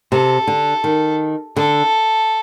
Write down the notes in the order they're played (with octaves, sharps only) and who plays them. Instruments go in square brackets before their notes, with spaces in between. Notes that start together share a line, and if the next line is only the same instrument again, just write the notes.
[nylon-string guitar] C3 [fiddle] A4
[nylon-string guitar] D3
D#3
[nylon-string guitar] D3 [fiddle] A4